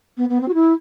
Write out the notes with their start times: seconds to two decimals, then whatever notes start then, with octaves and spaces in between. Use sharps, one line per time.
0.17 B3
0.29 B3
0.41 C4
0.48 F#4
0.54 E4